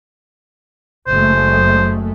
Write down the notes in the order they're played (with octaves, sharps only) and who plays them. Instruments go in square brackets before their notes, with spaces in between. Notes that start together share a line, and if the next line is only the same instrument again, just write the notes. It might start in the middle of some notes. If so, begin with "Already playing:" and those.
[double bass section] F#1 G#3 A3 [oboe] C5